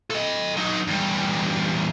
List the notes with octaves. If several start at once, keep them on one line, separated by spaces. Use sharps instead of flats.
A4 D#5
F#3 D#4
E2 G3